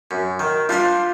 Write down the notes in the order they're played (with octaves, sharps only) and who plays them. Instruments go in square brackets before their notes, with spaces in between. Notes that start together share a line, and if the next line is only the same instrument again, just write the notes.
[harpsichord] F#2
D#3
[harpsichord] G3 D4 C5 [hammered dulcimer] F4